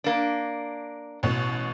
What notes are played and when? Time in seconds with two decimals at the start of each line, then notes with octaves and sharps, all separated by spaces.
0.04 A#3 D4
1.23 A1 B2